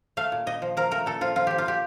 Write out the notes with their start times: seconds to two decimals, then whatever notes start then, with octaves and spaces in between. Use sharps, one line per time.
0.17 A3 F5
0.32 A#2
0.46 A#2 D#5
0.62 F3
0.77 F3 A#4
0.91 A3 A#4
1.06 A#2 A4
1.21 F3 F4
1.36 F3 F4
1.47 F3 G4
1.58 F4
1.66 A#2 G4